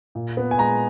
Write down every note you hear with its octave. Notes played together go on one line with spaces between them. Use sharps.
A#2
B3
G#5
G#3 A#5